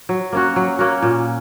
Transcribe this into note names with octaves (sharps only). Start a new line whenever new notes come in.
F#3
A#3 C#4 F#4
F#3
A#3 C#4 F#4
A#2